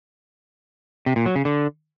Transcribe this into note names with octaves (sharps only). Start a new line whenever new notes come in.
C3
A#2
F#3
C#3
D3